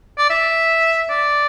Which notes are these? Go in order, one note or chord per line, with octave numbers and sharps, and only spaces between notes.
D5
E5
D5